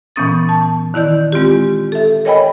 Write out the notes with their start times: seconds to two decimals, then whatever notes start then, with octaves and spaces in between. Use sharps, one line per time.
0.16 A#2 E3 B3 C#4 D#6 A6
0.49 A5
0.94 D#3 E4 D5 G6
1.32 G#3 C4 F4 G4
1.92 A4 E5
2.25 A#4 C#5 D#5 G5 G#5 B5